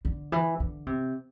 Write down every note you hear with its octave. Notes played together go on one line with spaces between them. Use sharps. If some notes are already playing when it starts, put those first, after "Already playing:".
D3
E3
D3
C3